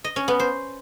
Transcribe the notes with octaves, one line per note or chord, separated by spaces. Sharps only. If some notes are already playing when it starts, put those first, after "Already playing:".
D#5
C#4
B3
C5